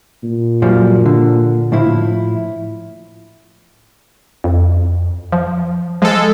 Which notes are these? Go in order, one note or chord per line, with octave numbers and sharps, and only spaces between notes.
A#2
F#2 F3 G3
D3
A2 F3 E4
F2
F3
F3 G#3 A4